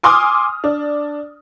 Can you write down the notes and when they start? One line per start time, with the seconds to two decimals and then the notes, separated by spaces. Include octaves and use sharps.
0.03 G#5 C6 D6 D#6 F6
0.64 D4